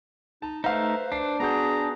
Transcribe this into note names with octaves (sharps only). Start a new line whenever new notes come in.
D#4 A5
A3 D#4 B4 C5 E5 F5
D4 C7
B3 F#4 G#4 A#5 G6